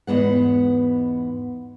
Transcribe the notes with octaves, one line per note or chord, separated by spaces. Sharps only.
E2 G#2 B3 F#5